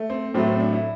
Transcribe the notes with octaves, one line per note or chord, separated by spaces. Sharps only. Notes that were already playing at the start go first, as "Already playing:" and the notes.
Already playing: A3
C4
A2 F#3 A3 C4
C4
D4
E4